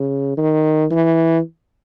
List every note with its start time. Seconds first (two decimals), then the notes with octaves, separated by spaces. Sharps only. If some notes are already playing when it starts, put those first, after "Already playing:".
Already playing: C#3
0.37 D#3
0.91 E3